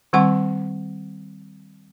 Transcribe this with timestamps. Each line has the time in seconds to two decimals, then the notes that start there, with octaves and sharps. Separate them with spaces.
0.13 D#3 G3 C4 F#5 C6 C#6